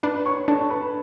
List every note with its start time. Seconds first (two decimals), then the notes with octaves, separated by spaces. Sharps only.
0.03 D4 B4 B5
0.26 C#5 C#6
0.48 D4 A4 A5
0.70 B4 B5